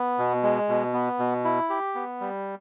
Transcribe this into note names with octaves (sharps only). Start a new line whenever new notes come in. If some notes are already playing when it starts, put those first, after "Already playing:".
Already playing: B3
B2
G#3
B2
B3
B2
E4
G4
B3
G3